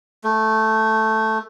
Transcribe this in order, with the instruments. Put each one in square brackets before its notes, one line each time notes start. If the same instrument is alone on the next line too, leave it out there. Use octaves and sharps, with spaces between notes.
[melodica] A3